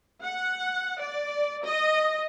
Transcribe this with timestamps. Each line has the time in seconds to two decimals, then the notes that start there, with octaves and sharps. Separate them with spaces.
0.21 F#5
0.99 D5
1.63 D#5